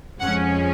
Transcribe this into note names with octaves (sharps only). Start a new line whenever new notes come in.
F2 F3 G#3 C#4 F#5